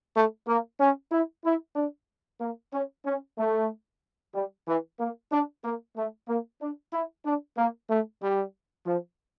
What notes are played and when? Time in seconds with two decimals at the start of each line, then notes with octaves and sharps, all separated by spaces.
0.15 A3
0.47 A#3
0.80 C#4
1.12 E4
1.45 E4
1.76 D4
2.41 A#3
2.73 C#4
3.06 C#4
3.38 A3
4.34 G3
4.67 E3
4.99 A#3
5.31 D4
5.64 A#3
5.96 A3
6.28 A#3
6.61 D4
6.93 E4
7.25 D4
7.57 A#3
7.90 A3
8.22 G3
8.86 F3